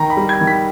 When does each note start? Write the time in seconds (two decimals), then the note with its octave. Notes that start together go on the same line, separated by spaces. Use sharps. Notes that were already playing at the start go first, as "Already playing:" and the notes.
Already playing: D#3 A#5
0.10 B5
0.17 G3
0.29 G#6
0.41 D#3
0.47 B6